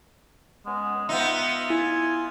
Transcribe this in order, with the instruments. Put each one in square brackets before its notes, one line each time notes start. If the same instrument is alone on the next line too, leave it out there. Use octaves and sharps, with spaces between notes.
[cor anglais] G#3 [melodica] B3 C#4
[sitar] B3 D#4 [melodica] F4 [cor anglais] E5
[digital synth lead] E4 [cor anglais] G#5